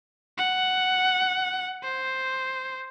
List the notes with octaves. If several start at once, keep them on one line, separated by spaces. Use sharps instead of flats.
F#5
C5